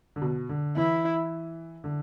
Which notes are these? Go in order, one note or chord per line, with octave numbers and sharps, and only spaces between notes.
D3
B2
D3
E3 E4
D3